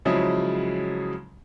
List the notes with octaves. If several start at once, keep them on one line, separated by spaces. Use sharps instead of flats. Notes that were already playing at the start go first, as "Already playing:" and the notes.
C#3 F3 F#3 G#3 E4